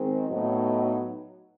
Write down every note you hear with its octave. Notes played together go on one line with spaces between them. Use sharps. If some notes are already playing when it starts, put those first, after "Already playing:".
Already playing: D#3 G#3 C4
A2 F#3 B3 D#4